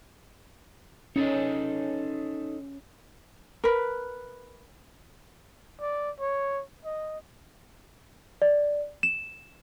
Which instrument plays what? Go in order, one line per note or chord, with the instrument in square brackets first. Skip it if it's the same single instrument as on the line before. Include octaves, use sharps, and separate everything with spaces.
[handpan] C#4 [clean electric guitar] D#4 A4 D#5
[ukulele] A#4 B4
[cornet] D5
C#5
D#5
[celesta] D5
E7